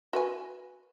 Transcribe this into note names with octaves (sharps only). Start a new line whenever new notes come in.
F#4 B4 G#5